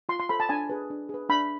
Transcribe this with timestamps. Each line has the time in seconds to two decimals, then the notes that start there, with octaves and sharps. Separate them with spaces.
0.09 F4 C6
0.20 C6
0.29 A4 C5 B5
0.40 A5
0.49 D4 G#5
0.70 G#4 B4
0.90 D4
1.09 G#4 B4
1.29 D4 B5